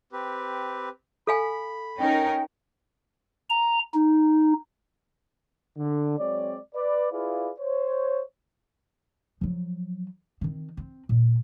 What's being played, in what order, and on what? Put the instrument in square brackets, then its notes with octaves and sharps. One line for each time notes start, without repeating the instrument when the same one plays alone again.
[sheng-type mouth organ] C4 G4 B4
[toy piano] A4 F5 G#5 [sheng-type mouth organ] B5
[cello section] C#4 D#4 A#4 [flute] G5
[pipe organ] A#5
D#4
[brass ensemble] D3
F#3 G#3 C4 C#5 D5
B4 D5
E4 F4 G#4 B4 D5 F5
C5 C#5
[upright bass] F3 F#3
D#3 C4
C4
A#2